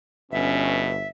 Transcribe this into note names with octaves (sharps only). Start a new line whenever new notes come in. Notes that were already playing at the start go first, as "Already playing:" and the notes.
G1 B2 C#4 E5